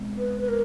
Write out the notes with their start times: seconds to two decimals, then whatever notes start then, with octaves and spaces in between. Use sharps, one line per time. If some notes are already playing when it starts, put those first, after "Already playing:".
Already playing: B2 G#3 C4
0.18 B4
0.41 B4
0.48 A#4